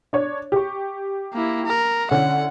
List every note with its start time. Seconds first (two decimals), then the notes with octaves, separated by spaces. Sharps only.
0.13 D4 C#5
0.52 G4 C#6
1.33 A#3 E4
1.66 A#4
2.11 D3 C#4 E4 F#5